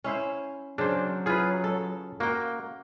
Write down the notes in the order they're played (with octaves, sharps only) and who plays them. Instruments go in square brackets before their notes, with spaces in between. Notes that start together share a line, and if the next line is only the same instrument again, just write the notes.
[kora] C#4 E4 C5
[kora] C#3 [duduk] F#3 [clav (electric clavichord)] D4 C5
[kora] E4 F4 [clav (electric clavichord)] G#4 B4
[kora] A4
[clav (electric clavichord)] A#3 [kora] F#4 G5